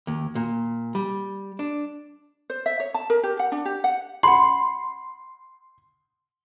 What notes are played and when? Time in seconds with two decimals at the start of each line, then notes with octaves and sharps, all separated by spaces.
0.07 D#2
0.35 A#2
0.95 G3
1.59 D4
2.50 C5
2.66 E5
2.80 C#5
2.94 A5
3.10 A#4
3.23 G4
3.39 F#5
3.52 D4
3.65 G4
3.84 F#5
4.23 F#5 B5 C6